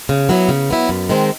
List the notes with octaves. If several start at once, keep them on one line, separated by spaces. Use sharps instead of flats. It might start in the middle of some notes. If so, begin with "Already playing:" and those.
C#3
F#3 B3 E4
C#3
F#3 B3 E4
F#2
D#3 G#3 C4